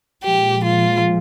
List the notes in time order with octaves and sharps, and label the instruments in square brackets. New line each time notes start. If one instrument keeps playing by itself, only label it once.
[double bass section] A#2 F3 G#3 [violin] G4
[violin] F4